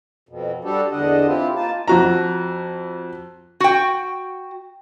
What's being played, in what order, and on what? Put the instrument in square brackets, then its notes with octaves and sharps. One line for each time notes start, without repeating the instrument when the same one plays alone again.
[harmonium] F2 B2
G3 D4 F#4 G4 A4
E2 D3 D4 D#5 F#5
C4 E4 F4 G4
A#3 D#4 F4 A5
[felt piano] F2 F#4 A#5
[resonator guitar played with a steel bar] F#4 G5